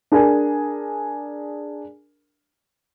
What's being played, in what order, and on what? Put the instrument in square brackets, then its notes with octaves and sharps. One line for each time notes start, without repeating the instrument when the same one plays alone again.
[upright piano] D4 G#4 A#4 G#5